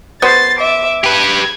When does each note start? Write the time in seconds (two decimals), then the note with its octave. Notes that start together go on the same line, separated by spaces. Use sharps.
0.22 F#3 B3 C5 A6 C7
0.58 E5 D6
1.04 G4 B4 G#6